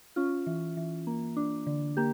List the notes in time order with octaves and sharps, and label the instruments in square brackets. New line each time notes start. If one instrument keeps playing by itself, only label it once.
[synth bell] C#4 F4
E3
E3
A#3
D4
D3
A#3 G4